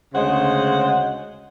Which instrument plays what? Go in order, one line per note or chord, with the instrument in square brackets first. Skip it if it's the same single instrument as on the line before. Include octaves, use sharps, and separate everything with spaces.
[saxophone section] D2 C#3 G#3 C5 F#5